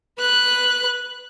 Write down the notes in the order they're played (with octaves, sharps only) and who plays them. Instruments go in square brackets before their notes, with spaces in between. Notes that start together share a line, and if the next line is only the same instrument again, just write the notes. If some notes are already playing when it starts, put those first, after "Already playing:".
[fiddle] B4 F#6